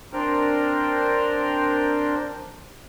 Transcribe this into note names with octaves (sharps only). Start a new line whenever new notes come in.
C4 D4 A#4 C5 G5 F6